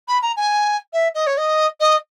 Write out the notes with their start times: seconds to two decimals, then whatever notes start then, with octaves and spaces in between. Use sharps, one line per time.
0.08 B5
0.22 A#5
0.37 G#5
0.93 E5
1.15 D#5
1.27 C#5
1.37 D#5
1.80 D#5